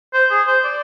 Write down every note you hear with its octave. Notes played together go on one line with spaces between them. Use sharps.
C5
G#4
C5
D5